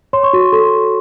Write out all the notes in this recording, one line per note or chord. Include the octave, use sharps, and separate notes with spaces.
C#5 C6
C#6
F#4 C6
A4 C6